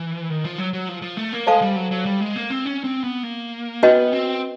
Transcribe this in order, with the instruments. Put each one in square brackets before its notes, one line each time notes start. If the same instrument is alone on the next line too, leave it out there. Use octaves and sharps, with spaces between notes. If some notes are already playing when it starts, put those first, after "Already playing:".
Already playing: [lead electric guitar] E3
D#3
F3
F#3
F#3
F3
F3
A3
A#3
[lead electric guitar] G#3 [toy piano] A4 C5 F5 A5
[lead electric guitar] G3
F#3
F#3
G3
G#3
A#3
C4
C#4
C4
B3
A#3
[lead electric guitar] B3 [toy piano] C#4 F#4 B4 D#5 G#5
[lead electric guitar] C4